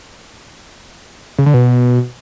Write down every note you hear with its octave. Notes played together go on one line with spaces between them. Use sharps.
C#3
D3
B2